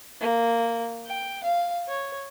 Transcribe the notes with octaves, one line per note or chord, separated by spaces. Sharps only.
A#3
G5
F5
C#5